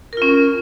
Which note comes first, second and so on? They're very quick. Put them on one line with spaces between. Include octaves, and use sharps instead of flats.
A#4 F4 C#4